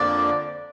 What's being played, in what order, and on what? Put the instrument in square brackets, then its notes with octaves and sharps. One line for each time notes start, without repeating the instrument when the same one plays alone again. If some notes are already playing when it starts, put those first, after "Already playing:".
Already playing: [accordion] F2 D3 F3 A#3 D4 [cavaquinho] D5